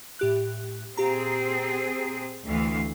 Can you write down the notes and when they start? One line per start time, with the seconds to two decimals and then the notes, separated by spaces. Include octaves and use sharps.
0.19 A2 G4 F#6
0.97 A#2 C4 G4 G#4 A#5
2.46 D2 E3 F5